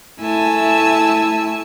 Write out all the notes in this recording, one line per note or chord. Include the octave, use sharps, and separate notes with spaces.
A3 E4 G#5 A5 E6